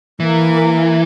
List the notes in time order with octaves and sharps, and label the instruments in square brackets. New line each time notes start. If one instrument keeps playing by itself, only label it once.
[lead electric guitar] E3 [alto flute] A#3